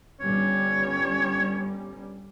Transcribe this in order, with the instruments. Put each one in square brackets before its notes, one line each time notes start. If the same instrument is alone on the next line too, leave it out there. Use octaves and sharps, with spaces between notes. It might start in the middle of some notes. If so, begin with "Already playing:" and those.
[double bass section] G1 G3 C#4 [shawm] C#5